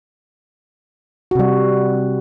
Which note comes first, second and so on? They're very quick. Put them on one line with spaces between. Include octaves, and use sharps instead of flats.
F#4 C3 G3